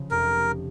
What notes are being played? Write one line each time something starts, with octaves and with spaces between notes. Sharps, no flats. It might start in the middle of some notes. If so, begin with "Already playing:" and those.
Already playing: C#3 F3
F1 A#4